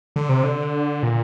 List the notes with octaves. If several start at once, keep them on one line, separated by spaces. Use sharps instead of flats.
D3
C3
D3
A#2